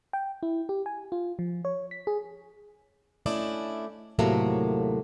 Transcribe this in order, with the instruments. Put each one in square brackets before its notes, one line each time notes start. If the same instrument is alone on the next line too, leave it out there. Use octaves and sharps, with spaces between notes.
[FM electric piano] G5
E4
G4
G#5
F4
F3
C#5
B6
G#4
[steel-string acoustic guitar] A3 C#4 D4 E4 D5 D#5
D#2 A2 C3 F#3 A3 A#3